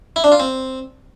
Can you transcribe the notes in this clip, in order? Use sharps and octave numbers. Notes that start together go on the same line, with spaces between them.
E4
D4
F4
C4